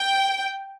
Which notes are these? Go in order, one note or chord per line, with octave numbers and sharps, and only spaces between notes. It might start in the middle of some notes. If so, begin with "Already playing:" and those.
Already playing: G5